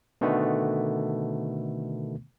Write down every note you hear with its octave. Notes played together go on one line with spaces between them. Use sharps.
B2 D3 D#3 A3 B3